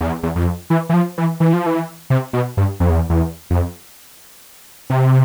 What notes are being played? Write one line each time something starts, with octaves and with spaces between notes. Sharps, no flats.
E2
E2
F2
E3
E3
F3
E3
E3
F3
E3
C3
B2
G2
F2
E2
E2
F2
C3